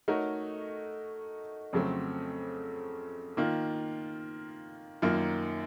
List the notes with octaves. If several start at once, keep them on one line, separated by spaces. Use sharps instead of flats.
A3 D#4 F#4 A#4 C#5
F2 C#3 F#3 A3 C4
D#3 A#3 F4
F#2 D#3 A#3 F4